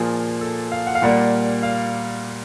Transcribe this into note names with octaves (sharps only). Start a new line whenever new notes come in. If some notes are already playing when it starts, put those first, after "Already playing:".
Already playing: A#2 F3 A#3 G#4
A4
F5
F#5
F5
A#2 G3 A#3 F#5
F5